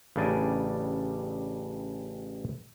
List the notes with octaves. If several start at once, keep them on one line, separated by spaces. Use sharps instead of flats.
A1 C#3 G3 D4 D5 G#5